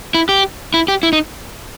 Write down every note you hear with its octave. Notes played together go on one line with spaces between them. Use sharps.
E4
G4
E4
G4
E4
D#4